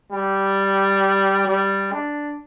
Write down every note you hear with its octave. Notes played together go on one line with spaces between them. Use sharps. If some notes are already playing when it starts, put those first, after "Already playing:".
G3
G3
D4